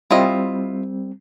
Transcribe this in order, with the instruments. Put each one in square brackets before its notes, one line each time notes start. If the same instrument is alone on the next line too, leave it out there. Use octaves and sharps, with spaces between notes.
[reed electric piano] G3 C4 [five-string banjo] E4 F4 D#5